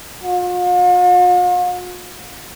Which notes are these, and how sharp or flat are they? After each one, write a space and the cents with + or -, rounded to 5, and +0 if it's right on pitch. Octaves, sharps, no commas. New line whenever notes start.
F4 +45